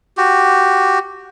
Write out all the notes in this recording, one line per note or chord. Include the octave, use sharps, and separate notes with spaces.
F#4 G4